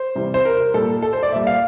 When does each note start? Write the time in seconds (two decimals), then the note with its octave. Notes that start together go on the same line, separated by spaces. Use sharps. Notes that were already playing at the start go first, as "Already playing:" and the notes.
Already playing: C5
0.15 C3 E3 G3
0.34 C5
0.45 A#4
0.74 A#2 G3 A4
1.02 A4
1.13 C5
1.23 D5
1.32 A#2 G3 E5
1.47 F5